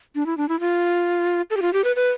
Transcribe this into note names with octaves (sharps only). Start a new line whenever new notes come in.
D4
E4
D4
E4
F4
A4
G4
F4
G4
B4
B4